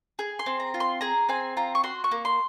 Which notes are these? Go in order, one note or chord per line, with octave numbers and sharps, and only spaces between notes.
G#4
C6
C4
A#5
F4
C6
G#4 A#5
C4 G#5
F4 A#5
C#6
F#4 C6
C#6
A#3
C6